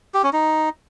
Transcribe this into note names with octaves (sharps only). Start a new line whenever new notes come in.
G4
C#4
D#4